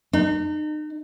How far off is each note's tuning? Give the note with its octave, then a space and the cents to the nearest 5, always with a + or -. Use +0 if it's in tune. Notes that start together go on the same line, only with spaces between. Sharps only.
D#4 -40